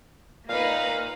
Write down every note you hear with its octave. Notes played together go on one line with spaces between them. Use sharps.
A#2 A#3 D#4 B4 F5